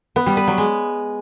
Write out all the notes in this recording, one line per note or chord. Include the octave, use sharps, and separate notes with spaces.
B3
G3
B4
F#3
G#3